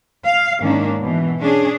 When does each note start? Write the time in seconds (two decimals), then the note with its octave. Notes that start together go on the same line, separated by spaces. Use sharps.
0.25 F5
0.60 G#2 D#3 A#3 C#4 D4
1.00 B2 E3
1.39 C#4 D4 G#4